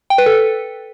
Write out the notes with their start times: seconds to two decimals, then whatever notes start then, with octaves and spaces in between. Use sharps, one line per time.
0.10 G5
0.18 B4
0.26 A4